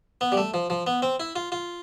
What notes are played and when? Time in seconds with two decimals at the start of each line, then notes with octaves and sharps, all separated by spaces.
0.21 B3
0.32 G3
0.37 A3
0.54 F3
0.70 F3
0.87 B3
1.02 C4
1.20 E4
1.36 F4
1.52 F4